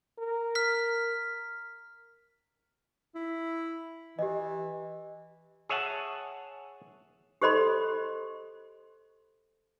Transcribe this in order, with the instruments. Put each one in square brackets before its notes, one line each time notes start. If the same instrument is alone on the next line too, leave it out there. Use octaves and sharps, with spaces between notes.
[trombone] A#4
[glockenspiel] F6 B6
[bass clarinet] E4
[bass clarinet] E3 [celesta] G4 D#5
[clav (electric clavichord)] G#4 C#5 E5 F#5 A5
[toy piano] G4 A4 C5 D#5 B5 C6